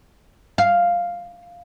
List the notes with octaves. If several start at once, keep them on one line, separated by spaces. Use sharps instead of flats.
F5